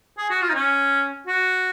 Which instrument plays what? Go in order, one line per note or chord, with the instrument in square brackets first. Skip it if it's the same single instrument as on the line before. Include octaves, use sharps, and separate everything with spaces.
[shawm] G#4
F#4
F4
D#4
C#4
F#4